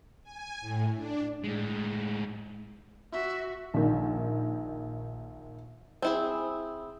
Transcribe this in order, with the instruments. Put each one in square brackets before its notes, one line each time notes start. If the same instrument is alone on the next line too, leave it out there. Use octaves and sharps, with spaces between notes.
[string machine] G#5
A2
D4
[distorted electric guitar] A2 G#3
[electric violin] F#4 [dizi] E5
[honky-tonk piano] A#1 D#3
[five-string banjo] C4 E4 G#4